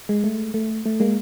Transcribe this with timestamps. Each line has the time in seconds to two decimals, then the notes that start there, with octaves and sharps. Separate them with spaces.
0.09 G#3
0.24 A3
0.54 A3
0.86 A3
1.00 G#3 A#3